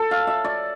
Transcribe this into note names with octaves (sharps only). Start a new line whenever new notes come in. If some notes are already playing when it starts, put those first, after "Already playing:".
Already playing: A4
F5
E5
D5